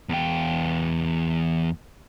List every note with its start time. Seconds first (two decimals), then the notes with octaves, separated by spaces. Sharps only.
0.09 E2 G5